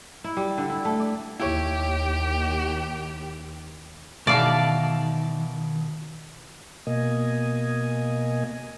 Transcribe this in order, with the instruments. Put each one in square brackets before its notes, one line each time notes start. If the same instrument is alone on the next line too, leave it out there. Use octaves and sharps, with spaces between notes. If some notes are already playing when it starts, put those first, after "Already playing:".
[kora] E4
G3
D3
E4
A3
D5
[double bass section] D#2 [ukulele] E4 C#5 [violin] G4
[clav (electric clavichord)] B2 E3 D#4 [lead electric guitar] D#3 [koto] D5 [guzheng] E5 F5 A5
[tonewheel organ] B2 A#3 D#5 G#5